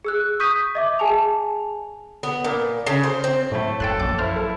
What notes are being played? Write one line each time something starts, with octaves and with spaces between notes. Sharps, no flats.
G#4 E6 F#6
C#6 D#6 G6 B6 D#7
D#5 E5 D6
G#4 G#5 A5 F7
B3
A#2
C#3
C5
C4
A2 F#3 A3 A#3 E4
F#2 A4 G5 C6 F#6
A#1 D6
E4 C5 F6
A4